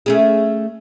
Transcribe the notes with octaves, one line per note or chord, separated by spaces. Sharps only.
A3 C#4 G#4